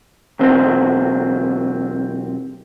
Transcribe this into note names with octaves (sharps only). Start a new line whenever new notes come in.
B1 E2 C4